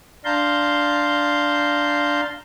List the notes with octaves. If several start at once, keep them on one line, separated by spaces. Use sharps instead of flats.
D4 F5 A5 A#5 C6 G6